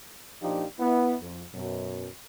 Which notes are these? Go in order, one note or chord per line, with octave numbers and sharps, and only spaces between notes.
A#2 F3 D4 D#4 F4 G4
B3 E4
F2
F#2 B2